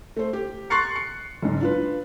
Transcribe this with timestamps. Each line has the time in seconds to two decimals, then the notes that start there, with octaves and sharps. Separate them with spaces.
0.17 A3 C5
0.33 G4
0.70 C6 C#6 F#6 A6 C7 C#7
0.96 C#7
1.42 F#1 G#2
1.60 D4 F4 B4